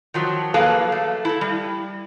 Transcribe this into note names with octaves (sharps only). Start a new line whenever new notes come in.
D#3 F3 F#3
F#3 A#3 G#4 A4 B4 F5
A3
E4 A4
G3